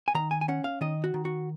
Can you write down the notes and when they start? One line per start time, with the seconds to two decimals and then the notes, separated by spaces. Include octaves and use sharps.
0.08 G#5
0.15 D#3 A#5
0.31 G#5
0.41 G#5
0.48 C#4 F#5
0.64 F5
0.81 D#3 D#5
1.04 F#4
1.14 D#3
1.25 F#4